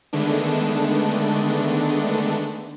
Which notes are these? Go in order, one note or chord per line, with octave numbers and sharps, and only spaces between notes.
D3 D#3 G#3 A3 B3 D4